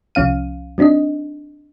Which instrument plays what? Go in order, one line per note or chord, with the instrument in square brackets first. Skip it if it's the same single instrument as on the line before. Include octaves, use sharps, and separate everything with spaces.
[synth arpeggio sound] C2 F3 C#4 F5 D#7
F#3 C4 D4 D#4 D#5